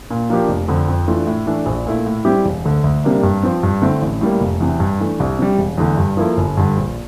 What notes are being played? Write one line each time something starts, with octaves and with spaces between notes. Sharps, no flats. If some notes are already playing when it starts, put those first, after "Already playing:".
A#2
F3 A#3 D4 G4
F1
F2 D3
F2
E3 A3 D4 F4
A2
E3 A3 D4
A#1
A#2 A3 E4
A2
G3 C4 E4 G4
E1
D2 D3
D2
C3 G3 A#3 D4
G2
F3 C4
G2
D3 A3 C4 E4
A1
A2 G3 A#3
F1
E2 C3
G2
E3 A3 D4
C2
C3 G3
E1
E2 D3 A3
G2
F3 A#3 E4 A4
G1
G2 D3
A#1